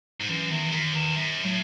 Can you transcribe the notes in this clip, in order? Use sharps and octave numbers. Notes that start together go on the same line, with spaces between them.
G#2
F#2 E3
E2 D#3
E3
F#2 D#3
E2 D#3
F#2
A2 F#3